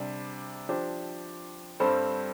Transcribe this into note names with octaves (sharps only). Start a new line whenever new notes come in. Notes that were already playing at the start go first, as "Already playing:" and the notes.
Already playing: C3 G3 D4
F3 D4 G4 C5
G2 G3 C4 A4 C5